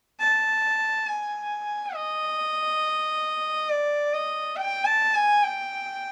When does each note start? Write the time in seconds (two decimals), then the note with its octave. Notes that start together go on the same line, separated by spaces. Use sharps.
0.19 A5
1.07 G#5
1.95 D#5
3.70 D5
4.13 D#5
4.56 G5
4.85 A5
5.15 G#5
5.43 G5